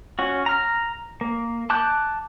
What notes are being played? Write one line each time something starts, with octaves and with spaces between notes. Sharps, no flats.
C#4 F#4
A#5 F6
A#3
A5 D6 F#6 G6